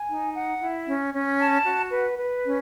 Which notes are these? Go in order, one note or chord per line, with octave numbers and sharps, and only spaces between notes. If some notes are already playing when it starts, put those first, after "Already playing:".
Already playing: G#5
D#4
F#5
E4
C#4
C#4
A5
F#4
B4
B4
C#4